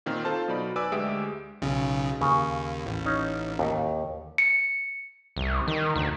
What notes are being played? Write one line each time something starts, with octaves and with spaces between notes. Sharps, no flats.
A#2 D#3 A#3 C4 F6
F4 A4 C5 A5 C6 F6
B2 F#3 D#4 D5 B5
B4 D5 G#5 D6 E6
D2 G#3 G4 E5 D#6 D7
B1 C#3
D#2 C#3
A1
C#4 D#4
D#2
C#7
C2
D#3
D2